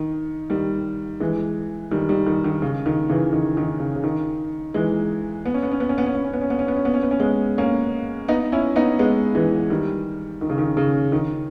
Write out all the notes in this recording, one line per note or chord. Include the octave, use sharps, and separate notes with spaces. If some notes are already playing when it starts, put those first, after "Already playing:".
Already playing: D#3
D#3 G3
E3 G#3
D#3 G3
D#3 G3
D#3
D#3
C#3
D#3
C#3 E3
D#3
D#3
C#3
C#3
D#3
E3 G#3
B3
C#4
B3
C#4
B3
C#4
B3
C#4
B3
C#4
B3
C#4
B3
C#4
B3
C#4
B3
C#4
B3
C#4
G#3 B3
A#3 C#4
B3 D#4
C#4 E4
B3 D#4
G#3 B3
E3 G#3
D#3 G3
D#3
C#3
D#3
C#3
D#3